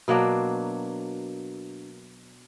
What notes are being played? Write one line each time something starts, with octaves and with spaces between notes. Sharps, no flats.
B2 F#3 A#3 D4